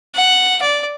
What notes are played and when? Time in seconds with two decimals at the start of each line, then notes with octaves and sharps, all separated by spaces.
0.15 F#5
0.62 D5